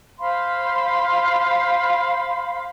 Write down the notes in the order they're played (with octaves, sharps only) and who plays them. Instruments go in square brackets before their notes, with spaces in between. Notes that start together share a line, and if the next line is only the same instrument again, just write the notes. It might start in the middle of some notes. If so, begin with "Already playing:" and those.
[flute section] C5 F5 B5 C6